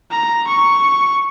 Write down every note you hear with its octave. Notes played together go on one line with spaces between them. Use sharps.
A#5
C#6